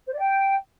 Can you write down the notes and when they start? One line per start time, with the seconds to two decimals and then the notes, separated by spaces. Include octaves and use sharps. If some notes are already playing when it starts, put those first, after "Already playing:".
0.06 C5
0.12 D5
0.19 G5